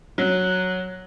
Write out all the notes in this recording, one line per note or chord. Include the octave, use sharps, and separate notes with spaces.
F#3 F#6